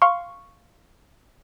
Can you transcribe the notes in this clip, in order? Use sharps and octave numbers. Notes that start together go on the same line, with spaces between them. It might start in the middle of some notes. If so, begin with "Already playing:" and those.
F5 C6 C#6